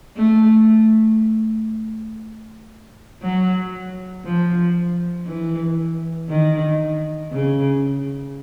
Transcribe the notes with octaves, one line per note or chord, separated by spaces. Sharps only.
A3
F#3
F3
E3
D#3
C#3